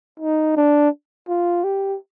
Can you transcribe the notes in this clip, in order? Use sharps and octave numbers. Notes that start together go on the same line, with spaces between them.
D#4
D4
F4
G4